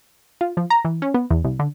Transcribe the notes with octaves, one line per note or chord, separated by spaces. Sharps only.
F4
F3
A#5
E3
C#4
B3
E2
C2
D3